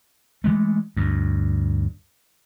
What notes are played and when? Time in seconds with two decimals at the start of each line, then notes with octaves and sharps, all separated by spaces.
0.44 E3 F3 G#3 A3
0.97 D2 G2